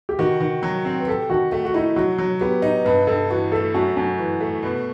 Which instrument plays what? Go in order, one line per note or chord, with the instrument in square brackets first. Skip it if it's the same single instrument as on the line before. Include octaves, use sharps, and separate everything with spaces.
[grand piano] G4
[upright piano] D#3 [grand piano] F#4
[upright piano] D#3
F#3
C4
[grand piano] B4
[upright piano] G4 [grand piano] A4
[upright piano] D#3 [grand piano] F#4
[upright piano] A3 [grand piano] F#4
[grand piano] F#4
[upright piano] D#4 [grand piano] E4
[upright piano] F#3 [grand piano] F#4
[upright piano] F#3
[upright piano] B3 [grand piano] G4
[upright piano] D#4
[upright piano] G2 [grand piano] B4
[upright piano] G2 [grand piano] A4
[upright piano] E3 [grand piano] F#4
[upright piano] A3 [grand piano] A4
[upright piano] F#2 [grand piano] F#4
[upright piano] F#2
E3
A3
B2